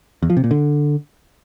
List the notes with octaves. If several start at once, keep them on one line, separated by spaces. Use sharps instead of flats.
E2
F3
C3
A#2
D3